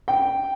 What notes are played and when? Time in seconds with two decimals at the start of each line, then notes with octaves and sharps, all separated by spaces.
0.08 G5